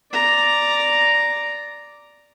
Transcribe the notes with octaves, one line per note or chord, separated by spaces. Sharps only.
D5 A#5